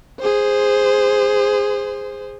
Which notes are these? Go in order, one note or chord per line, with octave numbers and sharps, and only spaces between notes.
G#4 C5